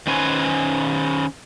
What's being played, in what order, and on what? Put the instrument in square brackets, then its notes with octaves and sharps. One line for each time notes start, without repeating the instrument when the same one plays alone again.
[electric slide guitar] D#3 C#4 B4 C5 G#5